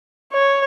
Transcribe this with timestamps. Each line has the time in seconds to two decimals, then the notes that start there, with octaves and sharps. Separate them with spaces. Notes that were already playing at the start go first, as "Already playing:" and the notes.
0.33 C#5